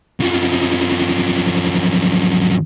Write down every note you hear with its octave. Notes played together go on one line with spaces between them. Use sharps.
F#2 F3